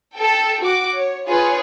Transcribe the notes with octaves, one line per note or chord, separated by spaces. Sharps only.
A4 G5
F#4 D6
C#5
F4 G#4 B4 C#5